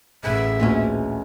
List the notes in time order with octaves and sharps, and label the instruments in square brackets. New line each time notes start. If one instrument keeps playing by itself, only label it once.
[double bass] A1 [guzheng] G#4 B4 F#5 [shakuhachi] E5
[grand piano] D2 A#2 [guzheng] E3 G#3 C#4